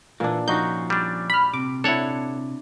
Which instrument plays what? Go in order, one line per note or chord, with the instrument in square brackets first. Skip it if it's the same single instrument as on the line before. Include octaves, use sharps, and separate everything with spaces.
[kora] A#2 D4 [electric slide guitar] E3
[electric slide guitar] F3 C#4 [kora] D#4 F#4 [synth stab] G6
[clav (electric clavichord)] G3 D4
[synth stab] B5 F6
[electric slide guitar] C3 [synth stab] D6
[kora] D4 E4 [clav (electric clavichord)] A4 C#5 F#5